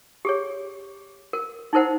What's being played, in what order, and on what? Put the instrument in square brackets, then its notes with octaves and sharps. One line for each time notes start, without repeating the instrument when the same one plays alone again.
[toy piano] G4 G#4 C#5
A#4
D#4 E4 A#4 C5 F#5